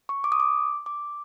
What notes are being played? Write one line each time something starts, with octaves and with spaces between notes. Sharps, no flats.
C#6
D6
D#6
D6
D6